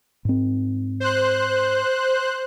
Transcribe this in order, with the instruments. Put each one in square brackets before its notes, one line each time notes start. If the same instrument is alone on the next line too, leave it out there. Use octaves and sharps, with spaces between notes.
[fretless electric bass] G#2 C4
[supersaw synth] C5 F#6